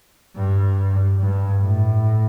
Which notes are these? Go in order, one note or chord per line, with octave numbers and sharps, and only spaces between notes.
G2
G2
A2